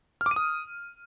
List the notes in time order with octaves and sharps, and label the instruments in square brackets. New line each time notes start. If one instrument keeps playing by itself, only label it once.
[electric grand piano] F6
D6
D#7
D#6